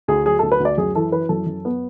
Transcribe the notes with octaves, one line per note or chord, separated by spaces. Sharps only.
D2 G#4
F#3 G#4
D2 A4
B4
D2
D5
F#2 G#4
E3 A4
E3 B4
F#2 A4
F#2
B3